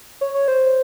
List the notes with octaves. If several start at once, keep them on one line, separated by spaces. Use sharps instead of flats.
C#5
C#5
C5